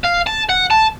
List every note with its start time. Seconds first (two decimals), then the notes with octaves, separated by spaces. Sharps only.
0.04 F5
0.26 A5
0.49 F#5
0.71 A5